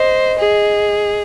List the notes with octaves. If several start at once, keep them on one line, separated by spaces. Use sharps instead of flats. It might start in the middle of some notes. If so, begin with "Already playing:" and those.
Already playing: C5 D#5
G#4